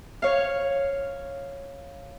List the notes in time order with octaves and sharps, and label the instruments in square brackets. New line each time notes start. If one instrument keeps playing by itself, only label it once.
[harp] C#5 F5